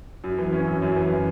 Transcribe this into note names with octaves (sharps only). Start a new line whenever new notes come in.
F#2
E3
C#4
F#2
F#2
E3
E3